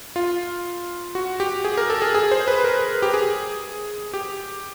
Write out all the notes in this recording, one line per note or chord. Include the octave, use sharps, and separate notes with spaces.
F4
F#4
G4
G#4
A#4
A4
G#4
G#4
C5
B4
A#4
G4
G#4
G4